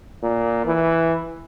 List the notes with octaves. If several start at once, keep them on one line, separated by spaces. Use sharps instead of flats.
A#2
E3